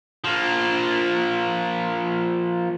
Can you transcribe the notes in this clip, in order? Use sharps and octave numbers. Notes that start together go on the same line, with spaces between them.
F3 A#3